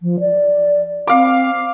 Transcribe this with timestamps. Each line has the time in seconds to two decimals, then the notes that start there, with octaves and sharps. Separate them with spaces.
0.02 F3
0.20 D5
1.07 C4 F5 D6